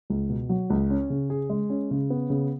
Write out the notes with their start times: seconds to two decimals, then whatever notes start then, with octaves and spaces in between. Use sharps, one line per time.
0.10 C#2
0.29 B2
0.49 F#3
0.70 C#2
0.90 C#4
1.10 C#3
1.30 G#4
1.50 G#3
1.70 C#4
1.91 C#3
2.10 B3
2.30 C#3